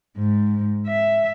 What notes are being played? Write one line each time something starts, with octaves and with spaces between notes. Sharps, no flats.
G#2
E5